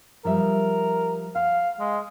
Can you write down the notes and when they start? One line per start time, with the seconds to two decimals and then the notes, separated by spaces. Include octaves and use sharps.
0.25 F3 G3 A#4 E5
1.35 F5 F#5
1.80 G#3